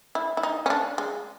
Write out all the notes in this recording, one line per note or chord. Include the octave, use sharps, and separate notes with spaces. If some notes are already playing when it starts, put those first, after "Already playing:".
E4
E4
D#4
C#4
D4
G#3